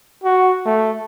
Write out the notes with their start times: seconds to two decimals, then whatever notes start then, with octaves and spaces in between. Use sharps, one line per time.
0.24 F#4
0.66 A3